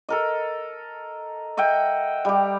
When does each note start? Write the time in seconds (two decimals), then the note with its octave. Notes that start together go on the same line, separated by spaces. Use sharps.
0.09 A4 A#4 D#5
1.57 D#5 E5 F#5 G5
2.25 G3 G4